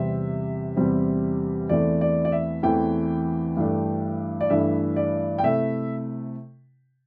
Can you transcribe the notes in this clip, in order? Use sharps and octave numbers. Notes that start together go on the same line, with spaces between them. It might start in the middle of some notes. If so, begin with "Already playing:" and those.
Already playing: E2 C3 G3 C4 E5
E2 C3 G3 C4
E2 E3 A3 C4 D5
D5
D5
E5
E2 E3 A3 C4 G5
G2 E3 A3 D4
D5
G2 E3 A3 D4 E5
D5
G5
C3 A3 E4 E5